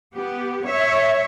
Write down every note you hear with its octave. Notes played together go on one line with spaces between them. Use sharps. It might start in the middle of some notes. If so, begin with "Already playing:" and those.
B3 G4
C#5 E5